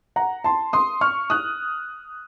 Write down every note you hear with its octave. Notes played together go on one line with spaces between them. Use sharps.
F#5 A#5
A5 C6
C6 D#6
C#6 F6
D#6 F#6